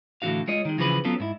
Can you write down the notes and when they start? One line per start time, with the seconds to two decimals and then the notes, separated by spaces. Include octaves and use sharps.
0.22 A2 D3 E3 D4 F#4 F5
0.48 G#3 F4 C#5 D#5
0.65 D#3 G#3
0.78 C#3 E3 F3 G#4 A4 B4
1.05 F#3 B3 C#4 F4 A4
1.20 G#2 E4